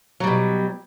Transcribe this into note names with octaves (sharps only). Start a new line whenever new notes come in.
B2 F#3 G3